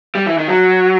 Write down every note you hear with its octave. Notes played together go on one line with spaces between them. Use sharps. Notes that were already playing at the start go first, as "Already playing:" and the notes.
G3
E3
D#3
F#3